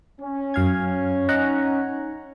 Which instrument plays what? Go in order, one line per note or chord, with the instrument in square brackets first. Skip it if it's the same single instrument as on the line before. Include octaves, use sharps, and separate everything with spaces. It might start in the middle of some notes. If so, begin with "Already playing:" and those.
[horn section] C#4
[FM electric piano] F#2 F5 G#6
D#4 F#5 A#5